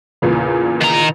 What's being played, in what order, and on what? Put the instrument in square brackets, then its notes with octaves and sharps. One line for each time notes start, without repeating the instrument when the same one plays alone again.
[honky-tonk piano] E2 A#2 C#3
[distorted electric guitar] D#3 A#5